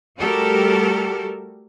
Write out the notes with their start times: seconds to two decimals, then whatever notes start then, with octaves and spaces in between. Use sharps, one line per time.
0.18 G3 A3 F#4 G4 A4 A#4